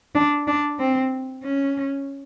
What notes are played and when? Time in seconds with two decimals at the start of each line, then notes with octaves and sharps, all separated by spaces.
0.15 D4
0.47 D4
0.79 C4
1.44 C#4